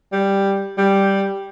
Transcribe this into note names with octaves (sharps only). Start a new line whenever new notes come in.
G3
G3